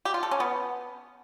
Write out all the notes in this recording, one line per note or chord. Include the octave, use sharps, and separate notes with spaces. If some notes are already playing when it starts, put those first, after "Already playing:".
G4
F4
A4
C#4
B3